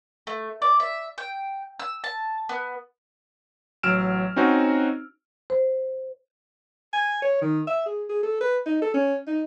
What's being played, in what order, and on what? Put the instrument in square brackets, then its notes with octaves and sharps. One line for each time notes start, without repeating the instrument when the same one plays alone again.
[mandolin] A3
D5
E5
G5
E6
A5
B3
[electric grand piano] A1 F#3 E6 F6 D7 E7
C4 C#4 D#4 F#4 C5
[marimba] C5
[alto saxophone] G#5
C#5
D#3
E5
G#4
G#4
A4
B4
D#4
A4
C#4
D#4